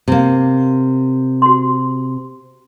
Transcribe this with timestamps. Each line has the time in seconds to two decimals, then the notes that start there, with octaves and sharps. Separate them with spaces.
0.08 C3 A#3
1.42 F#4 C6